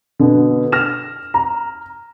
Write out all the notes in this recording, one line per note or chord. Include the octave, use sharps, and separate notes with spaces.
B2 D3
F6 A#6 E7
A#5